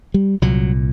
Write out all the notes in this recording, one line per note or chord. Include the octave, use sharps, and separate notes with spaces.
G3
C2 A#2 F#3